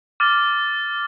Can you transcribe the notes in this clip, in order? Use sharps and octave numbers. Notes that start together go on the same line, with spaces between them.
D6 F6 A6